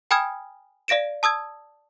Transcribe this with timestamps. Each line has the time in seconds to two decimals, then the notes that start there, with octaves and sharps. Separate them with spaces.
0.11 G5 G#5 B5 D#6 F6 G#6
0.88 D5 F5 A#6 D7 E7
1.23 A5 D#6 E6 G#6